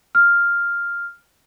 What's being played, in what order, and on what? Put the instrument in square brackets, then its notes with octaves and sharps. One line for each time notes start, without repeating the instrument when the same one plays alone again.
[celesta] F6